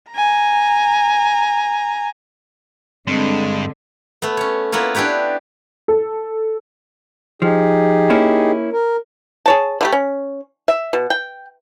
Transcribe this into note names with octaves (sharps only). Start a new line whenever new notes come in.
G#5 A#5
G2 D3 G#3 C4
A3 B3
C#4 C#5
A#3 B3 E4 F4 C#5
D4 E4 G4 B4 C#5
A4
F3 D#4 G4 G#4
A#3 C#4 E4
A#4
G#4 C#5 A5
D3 A3 G4
C#4
E5
B2
G5